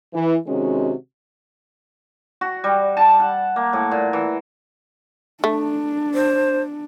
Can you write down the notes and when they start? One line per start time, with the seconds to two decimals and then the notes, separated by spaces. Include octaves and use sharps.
0.13 E3
0.47 C3 D#3 G#3 C#4 F#4
2.41 F#4
2.64 G3
2.97 A5
3.20 F#5
3.56 A#3
3.73 A2
3.91 A#2
4.13 E3
5.44 A3 D4
6.14 C5